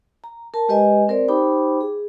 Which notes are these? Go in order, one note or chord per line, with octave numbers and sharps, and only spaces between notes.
A#5
A#4 A5
G#3 G4 B4 D#5 G#5
C4 A#4 C5 D5
D#4 G4 C5 G5 B5 D6
G#4